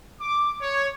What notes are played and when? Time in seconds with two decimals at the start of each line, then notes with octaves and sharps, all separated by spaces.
0.20 D6
0.61 C#5